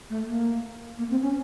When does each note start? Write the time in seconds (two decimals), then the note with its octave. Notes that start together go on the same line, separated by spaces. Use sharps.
0.10 A3
0.27 A#3
0.98 A#3
1.10 C4
1.22 C#4